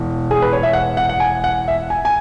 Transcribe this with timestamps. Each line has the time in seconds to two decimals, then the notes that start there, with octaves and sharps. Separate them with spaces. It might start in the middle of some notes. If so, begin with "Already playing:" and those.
Already playing: E1 E3
0.31 G#4
0.42 B4
0.53 C#5
0.63 E5
0.73 F#5
0.97 F#5
1.09 F#5
1.20 G#5
1.44 F#5
1.68 E5
1.90 G#5
2.05 G#5